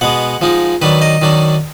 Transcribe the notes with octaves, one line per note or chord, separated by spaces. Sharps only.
B2 G#3 B3 F#5
F3 G#3 D#4
D#3 F#3 D4 B4
D#5
D#3 F#3 D4